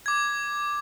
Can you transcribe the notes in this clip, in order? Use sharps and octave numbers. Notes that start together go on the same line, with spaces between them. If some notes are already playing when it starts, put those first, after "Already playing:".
D6 G#6